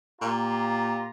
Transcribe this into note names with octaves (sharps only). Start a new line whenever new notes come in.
A#2 F4 G4 A#5